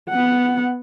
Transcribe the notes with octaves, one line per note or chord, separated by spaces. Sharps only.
B3 F#5